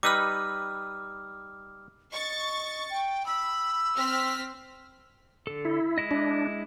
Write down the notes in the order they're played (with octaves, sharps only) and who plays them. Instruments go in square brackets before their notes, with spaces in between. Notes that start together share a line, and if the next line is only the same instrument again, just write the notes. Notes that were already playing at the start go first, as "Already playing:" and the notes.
[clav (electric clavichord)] G3 D#4 B4 [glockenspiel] D6 E6 F6
[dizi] D#5 [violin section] C#6 A6
[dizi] G5
[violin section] B5 [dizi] E6
[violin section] C4 F6 B6
[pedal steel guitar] D3 A4
[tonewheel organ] E4
[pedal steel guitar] G#3 E4 D#5
[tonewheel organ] D4